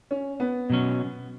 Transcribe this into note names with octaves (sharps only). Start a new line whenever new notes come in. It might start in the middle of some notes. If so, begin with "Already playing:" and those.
C#4
B3
B2 F#3 C#4